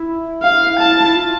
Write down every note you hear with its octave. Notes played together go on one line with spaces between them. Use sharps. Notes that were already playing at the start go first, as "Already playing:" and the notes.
Already playing: E4
F5
A5
E4
F4